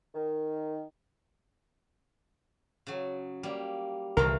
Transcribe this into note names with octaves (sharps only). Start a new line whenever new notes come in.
D#3
C#3 F#3
G3 A#3
C2 D3 E3 F3 A3 A#4